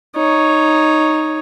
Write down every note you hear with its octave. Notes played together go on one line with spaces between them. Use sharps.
D#4 C#5